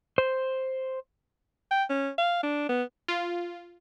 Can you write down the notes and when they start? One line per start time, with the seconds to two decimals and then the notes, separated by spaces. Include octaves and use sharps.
0.18 C5
1.71 G5
1.90 C#4
2.18 F5
2.43 D4
2.69 B3
3.08 F4